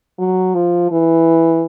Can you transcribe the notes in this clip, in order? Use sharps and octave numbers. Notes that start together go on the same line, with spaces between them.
F#3
F3
E3